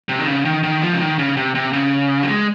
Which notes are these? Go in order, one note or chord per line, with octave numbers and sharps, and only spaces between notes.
C3
D#3
C#3
D#3
D#3
F3
C#3
D#3
C#3
C3
C3
C#3
F#3
G#3